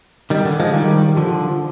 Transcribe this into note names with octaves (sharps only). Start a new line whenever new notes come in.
D#3 G3
D3
F3 G#3
D#3 G3
D3 F3